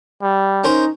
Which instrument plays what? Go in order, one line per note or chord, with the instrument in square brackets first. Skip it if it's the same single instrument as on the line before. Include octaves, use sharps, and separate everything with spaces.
[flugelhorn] G3
[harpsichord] C#4 A#4 C5 [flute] D#4